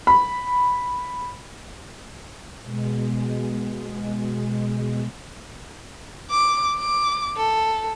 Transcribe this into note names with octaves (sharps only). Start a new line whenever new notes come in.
B5
B2 G#3
D6
D6
A4